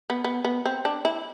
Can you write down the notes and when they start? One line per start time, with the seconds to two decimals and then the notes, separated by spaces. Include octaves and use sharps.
0.10 B3
0.24 B3
0.45 B3
0.66 C4
0.85 D4
1.05 E4